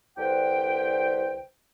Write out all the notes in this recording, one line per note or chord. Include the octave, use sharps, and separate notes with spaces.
C2 D3 B4 C5 G5